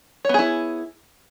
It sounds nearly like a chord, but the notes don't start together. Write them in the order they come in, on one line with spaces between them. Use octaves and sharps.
C#5 B3 G#4 E4